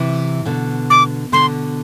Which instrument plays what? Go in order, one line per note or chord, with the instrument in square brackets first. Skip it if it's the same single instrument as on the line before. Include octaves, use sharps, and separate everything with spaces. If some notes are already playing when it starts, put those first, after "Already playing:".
Already playing: [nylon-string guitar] C3 E3
B2 D3
[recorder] D6
[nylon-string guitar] B2 D3 [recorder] C6